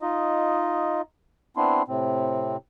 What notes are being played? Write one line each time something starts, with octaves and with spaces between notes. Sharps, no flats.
D#4 F4 D#5
B3 C4 D4 E4 C6
A2 C3 C4